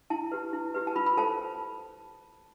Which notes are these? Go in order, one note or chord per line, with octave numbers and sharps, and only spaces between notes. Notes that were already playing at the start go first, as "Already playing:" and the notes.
E4 A5
G4 B4
E4
G4 B4
A5
F4 B5
B5
A4 C5 A5